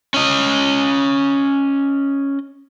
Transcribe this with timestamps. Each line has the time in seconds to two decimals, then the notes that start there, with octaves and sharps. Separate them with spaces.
0.14 C#4 D#5